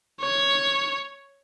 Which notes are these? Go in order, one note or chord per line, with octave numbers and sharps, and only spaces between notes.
C#5